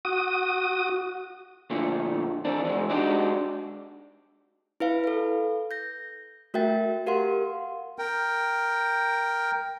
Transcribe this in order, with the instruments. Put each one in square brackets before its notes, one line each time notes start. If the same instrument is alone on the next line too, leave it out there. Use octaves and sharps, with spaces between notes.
[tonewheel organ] F#4 D#6
[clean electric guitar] A#2 D3 F3 A3
E3 C4 D4
E3 F#3 G#3
G#3 D4 D#4 F#4 G4
[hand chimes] E4 B4 F5
A4 B4
G6 A#6
A3 F#4 A#4 E5 G5 A6
G4 A#4 F5 F#5 C6
[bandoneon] A#4 G5